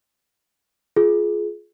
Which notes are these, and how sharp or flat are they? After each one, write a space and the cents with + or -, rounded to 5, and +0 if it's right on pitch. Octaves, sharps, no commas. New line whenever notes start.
F4 +0 G#4 +20